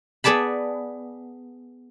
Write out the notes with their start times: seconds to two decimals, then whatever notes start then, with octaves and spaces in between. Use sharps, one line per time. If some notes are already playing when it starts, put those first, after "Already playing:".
0.24 B3 G#4 D5 A5 B5